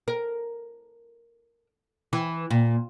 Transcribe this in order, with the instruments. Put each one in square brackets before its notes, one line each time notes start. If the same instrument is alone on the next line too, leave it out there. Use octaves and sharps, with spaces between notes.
[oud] A#4
E3
A#2